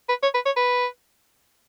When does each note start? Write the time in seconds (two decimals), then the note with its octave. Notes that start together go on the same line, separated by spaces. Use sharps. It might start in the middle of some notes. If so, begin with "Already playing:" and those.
0.09 B4
0.23 C#5
0.34 B4
0.46 C#5
0.56 B4